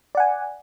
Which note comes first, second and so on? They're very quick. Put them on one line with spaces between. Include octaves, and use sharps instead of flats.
D5 F#5 G#5